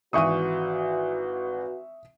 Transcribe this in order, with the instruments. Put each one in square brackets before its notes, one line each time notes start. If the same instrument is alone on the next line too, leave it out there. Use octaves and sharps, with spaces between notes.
[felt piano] G#1 E3 D#7 [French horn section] F#4 B4 [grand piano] E5 C#6 D#6